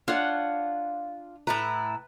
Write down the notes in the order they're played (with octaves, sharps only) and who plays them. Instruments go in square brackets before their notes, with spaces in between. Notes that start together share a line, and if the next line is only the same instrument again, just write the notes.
[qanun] D4 C#5 F#5 [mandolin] F4
[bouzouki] A2 E4 A#5 [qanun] B4